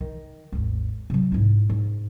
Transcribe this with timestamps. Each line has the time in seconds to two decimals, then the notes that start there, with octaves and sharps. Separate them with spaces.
0.01 D#3
0.52 G#1 D#2
1.10 C3 F#3
1.32 G#2 E4
1.69 G#2